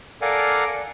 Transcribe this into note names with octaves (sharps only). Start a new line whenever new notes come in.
A4 A#4 D5 F5 F#5 G#5